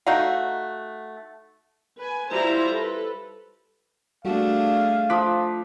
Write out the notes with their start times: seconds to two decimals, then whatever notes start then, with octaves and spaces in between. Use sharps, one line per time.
0.06 A3 D#4 F#4 F5
1.98 B4 G#5
2.31 G3 E4 F4 C5 A5 A#5
2.74 A4 B4
4.25 G3 A3 D4 F#4 G#4 F5
5.10 F3 D6 D#6 F#6 B6